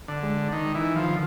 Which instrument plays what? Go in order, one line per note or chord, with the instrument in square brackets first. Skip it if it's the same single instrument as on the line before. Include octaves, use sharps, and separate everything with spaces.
[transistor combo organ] D3
[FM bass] G#3
[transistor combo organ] D#3
E3
[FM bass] D#3
[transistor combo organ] F3
[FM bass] D3